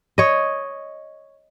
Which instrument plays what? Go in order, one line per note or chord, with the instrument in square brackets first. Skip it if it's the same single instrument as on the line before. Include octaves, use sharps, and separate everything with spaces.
[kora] C#5 D#5